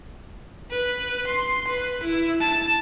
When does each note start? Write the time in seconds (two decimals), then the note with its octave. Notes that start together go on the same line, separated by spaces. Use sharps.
0.71 B4
1.27 C6
1.68 B4
2.04 E4
2.40 A5